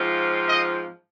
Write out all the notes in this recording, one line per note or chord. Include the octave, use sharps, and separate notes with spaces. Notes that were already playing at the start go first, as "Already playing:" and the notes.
Already playing: G#2 F3 C4 F4
D#5